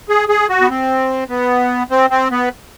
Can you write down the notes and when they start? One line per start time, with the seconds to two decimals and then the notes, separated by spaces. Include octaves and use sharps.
0.09 G#4
0.29 G#4
0.49 F#4
0.61 B3
0.70 C4
1.29 B3
1.90 C4
2.10 C4
2.31 B3